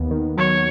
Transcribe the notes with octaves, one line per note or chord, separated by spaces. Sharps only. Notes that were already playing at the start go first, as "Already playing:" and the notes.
Already playing: D#2 B3
D#3
F#3 C#5